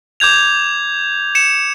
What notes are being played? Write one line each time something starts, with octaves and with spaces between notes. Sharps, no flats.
D6 G6 G#6 F7
C#7 E7